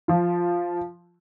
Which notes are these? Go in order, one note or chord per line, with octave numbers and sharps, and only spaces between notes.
F3 F4